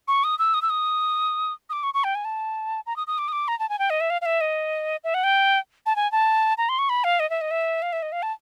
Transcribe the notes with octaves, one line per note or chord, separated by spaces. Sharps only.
C#6
D#6
E6
D#6
E6
D#6
D#6
D6
C#6
C#6
G5
G#5
A5
A#5
D#6
D#6
D6
D#6
D6
A#5
A5
G#5
G5
D#5
E5
F5
F5
E5
D#5
E5
F#5
G5
A5
G#5
A5
A#5
C6
C#6
B5
F5
D#5
E5
D#5
E5
F5
E5
D#5
F5
A5